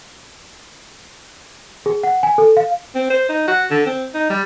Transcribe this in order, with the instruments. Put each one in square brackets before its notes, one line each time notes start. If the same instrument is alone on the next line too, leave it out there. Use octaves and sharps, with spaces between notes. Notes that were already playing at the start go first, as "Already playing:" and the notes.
[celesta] G#4
F#5
G#5
A4
F5
[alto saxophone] C4
C5
D#4
F#4
D3
C4
D#4
G3